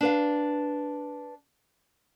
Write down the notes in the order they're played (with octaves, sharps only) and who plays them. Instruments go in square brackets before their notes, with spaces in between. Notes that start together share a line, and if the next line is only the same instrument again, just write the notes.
[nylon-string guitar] D4 B4 F5